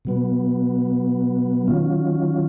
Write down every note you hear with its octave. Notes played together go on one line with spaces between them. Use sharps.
B2 F#3 B3
D#3 F#3 C#4 F4